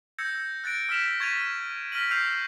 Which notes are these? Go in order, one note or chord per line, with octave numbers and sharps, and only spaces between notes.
E6 G6 G#6 A#6 C#7
F#6 A6 A#6 D7
E6 F6 B6 E7 F7
C#6 G#6 A6 B6 D#7 F7
F6 A#6 B6 D#7 F#7
E6 F6 G6 C7 F7